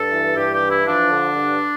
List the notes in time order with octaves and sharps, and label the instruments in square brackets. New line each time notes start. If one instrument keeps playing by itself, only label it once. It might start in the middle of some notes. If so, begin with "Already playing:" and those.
Already playing: [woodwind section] G2 A4
E3
G2 G4
G4
E3
E4
F3 D4
D3
G2